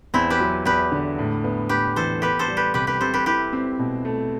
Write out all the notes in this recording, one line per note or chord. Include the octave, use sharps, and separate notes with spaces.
E2 C4 E4
G4 B4
F#3
E2 G4 B4
D3
A2
B3
A2 G4 B4
E3 A4 C5
B3 G4 B4
A4 C5
G3
G4 B4
C2 G4 B4
G4 B4
C3 A4 C5
G4 B4
E4 G4 B4
C4
B2
A3